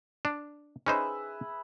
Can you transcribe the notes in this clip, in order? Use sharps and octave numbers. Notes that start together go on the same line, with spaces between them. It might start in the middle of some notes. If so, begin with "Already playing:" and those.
D4
C#4 D#4 G#4 B4 C5 E5